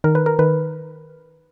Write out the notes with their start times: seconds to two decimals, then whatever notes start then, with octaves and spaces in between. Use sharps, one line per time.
0.04 D#3 A#4
0.15 B4
0.26 A#4
0.39 D#3 B4